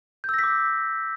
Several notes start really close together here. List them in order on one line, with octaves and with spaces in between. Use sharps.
G6 E6 A#6 B6 D6